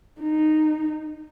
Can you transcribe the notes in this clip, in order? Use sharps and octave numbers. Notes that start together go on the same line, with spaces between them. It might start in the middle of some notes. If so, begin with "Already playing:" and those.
D#4